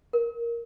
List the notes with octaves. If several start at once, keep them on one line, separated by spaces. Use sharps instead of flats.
A#4